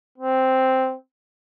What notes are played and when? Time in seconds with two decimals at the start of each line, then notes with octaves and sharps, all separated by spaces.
0.18 C4